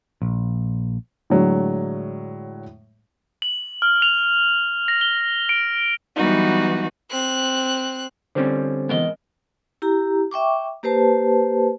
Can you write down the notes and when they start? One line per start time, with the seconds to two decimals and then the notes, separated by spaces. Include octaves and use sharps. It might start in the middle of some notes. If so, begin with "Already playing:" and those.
0.22 A#1
1.30 A2 D3 F#3 G#3 D4
3.42 F#7
3.82 F6
4.02 F7
4.88 A#6
5.01 G7
5.49 D7
6.15 E3 F#3 G3 B3 D#4 F#4
7.10 C4 F#6
8.35 D3 G3 C4 C#4 C5
8.89 G#2 E3 B3 A#4 D#5
9.82 E4 G4 A#5
10.31 E5 G5 C#6 D6
10.83 A#3 G4 B4 C5 A5